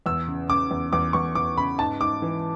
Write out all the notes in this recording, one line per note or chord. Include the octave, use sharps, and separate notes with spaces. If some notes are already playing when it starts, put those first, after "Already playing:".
E2 E6
C#3
C#3 D6
E2
E2 D6
E2 C#6
E2 D6
C#3 B5
G#2 A5
G#2 D6
E3